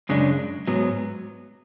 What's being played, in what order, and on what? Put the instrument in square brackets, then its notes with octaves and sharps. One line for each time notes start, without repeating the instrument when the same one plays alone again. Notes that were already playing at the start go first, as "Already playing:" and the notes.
[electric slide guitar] F#2 C#3 G#3 D4
G#2 F#3 B3